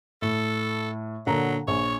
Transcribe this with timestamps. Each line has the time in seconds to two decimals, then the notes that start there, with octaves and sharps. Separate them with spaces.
0.22 A2 A4
1.27 A#2 D3 F#3 A#5
1.68 A#1 C#5